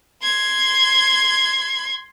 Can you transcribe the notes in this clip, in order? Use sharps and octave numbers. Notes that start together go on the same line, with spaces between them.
C6 G#6